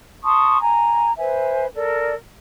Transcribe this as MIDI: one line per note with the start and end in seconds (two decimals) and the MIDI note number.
0.24 0.58 81
0.24 0.58 84
0.24 0.58 85
0.24 0.58 87
0.60 1.11 80
0.60 1.11 82
1.17 1.66 71
1.17 1.66 72
1.17 1.66 76
1.17 1.66 80
1.73 2.14 69
1.73 2.14 70
1.73 2.14 74